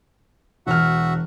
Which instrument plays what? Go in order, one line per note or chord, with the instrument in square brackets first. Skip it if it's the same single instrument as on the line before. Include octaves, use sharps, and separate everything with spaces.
[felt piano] E1 F6 [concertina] F#4 E5 F#5